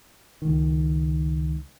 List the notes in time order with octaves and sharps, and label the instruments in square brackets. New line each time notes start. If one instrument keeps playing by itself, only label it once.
[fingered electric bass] C#2 D#3